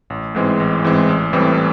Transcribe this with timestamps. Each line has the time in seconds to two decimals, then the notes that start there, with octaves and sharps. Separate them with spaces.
0.10 A1
0.35 G#2 E3 G#3 C4
0.60 A1
0.84 G#2 E3 G#3 C4
1.09 A1
1.33 A2 E3 G3 C4